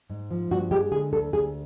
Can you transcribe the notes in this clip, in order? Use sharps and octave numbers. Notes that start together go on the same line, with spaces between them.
G#2
F3
G2 F#4
G#3 G4
D3 G#4
D2 A4
D2 G#4